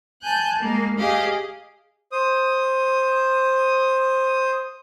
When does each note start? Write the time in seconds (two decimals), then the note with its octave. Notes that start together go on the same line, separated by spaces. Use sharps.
0.23 G#5 A5 F#6 G6
0.59 G#3 A#3
0.99 G4 G#4 D#5 F5
2.12 C5 D#6